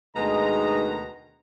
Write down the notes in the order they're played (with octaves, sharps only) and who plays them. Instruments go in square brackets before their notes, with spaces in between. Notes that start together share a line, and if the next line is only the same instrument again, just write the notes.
[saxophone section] D2 B4 [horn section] B2 D#3 A#5 [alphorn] G#3 [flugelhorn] D#4